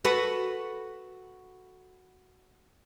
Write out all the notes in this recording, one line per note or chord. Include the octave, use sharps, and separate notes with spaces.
F#4 A4 B4